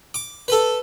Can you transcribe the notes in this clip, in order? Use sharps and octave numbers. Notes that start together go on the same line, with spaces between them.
D6
A4 B4